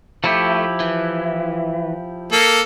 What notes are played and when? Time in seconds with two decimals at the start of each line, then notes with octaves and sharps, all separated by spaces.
0.24 F3 A3 E4 G4
0.80 E3
2.32 A#3 A4